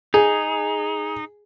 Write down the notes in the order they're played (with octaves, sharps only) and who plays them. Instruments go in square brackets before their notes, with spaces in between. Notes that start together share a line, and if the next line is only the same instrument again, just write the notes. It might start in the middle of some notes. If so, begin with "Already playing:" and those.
[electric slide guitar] D#4 [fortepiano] G#4